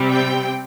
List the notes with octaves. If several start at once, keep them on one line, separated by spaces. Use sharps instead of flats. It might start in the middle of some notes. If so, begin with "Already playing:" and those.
Already playing: C3 G3 C4
G5